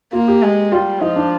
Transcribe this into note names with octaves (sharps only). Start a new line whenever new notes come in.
A#3 F4
G4
G#3
G3 F4
F3 D#4
D4